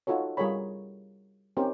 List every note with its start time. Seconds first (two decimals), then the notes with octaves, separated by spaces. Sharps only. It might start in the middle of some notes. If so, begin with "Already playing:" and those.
0.07 D#4 F4 F#4 A4 C#5
0.37 G3 F4 G#4 A#4 C#5 B5
1.57 C4 C#4 D#4 G4 A#4 C5